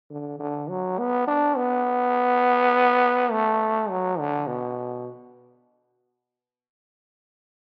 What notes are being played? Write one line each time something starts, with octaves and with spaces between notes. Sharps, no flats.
D3
D3
F#3
B3
D4
B3
A3
F#3
D3
B2